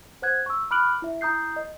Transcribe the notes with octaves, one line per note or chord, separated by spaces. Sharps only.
C5 F#5 F#6 G#6
C#6 E6
B5 D6 F6 F#6 D7 F#7
E4 E5
E4 A#5 D#6 G6 C7
D#5